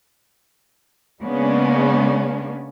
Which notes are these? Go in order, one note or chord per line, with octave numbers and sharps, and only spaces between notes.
C#3 G#3 A#3 B3 C#4 D4